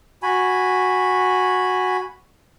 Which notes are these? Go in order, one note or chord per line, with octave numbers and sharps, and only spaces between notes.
F#4 G#5 B5